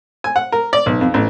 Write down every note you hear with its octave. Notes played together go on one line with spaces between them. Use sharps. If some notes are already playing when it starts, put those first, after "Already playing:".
G#5
F#5
A#4
D5
B1
F2
A1